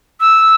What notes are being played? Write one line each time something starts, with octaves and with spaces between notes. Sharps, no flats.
E6